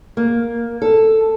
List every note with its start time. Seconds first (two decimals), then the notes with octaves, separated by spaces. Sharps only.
0.17 A#3
0.82 A4